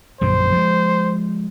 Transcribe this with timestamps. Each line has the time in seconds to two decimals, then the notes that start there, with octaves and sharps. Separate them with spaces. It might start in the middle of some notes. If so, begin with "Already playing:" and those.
0.21 A#1 F#2 D3 C5
0.53 F3 G#3